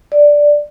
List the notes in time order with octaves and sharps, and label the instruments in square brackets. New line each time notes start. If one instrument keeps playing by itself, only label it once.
[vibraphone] D5